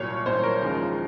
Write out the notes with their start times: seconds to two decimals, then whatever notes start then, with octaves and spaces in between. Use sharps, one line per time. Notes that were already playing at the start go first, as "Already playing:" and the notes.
Already playing: C2 A#2 F#3 C#5
0.26 C2 A#2 F#3 C5
0.43 A#4
0.61 D#2 C#3 F3 G#3